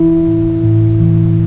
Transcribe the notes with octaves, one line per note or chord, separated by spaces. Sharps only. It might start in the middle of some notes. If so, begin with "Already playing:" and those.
Already playing: E3 E4
A2
A2
E3